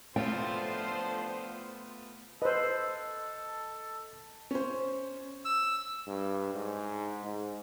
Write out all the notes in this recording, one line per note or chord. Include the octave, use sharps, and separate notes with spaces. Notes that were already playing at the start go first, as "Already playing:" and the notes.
A2 D3 F3 A3 B3 F4 C5 G5
A4 B4 C5 D#5 E6
C#4 C5
E6
G2
G#2
G#2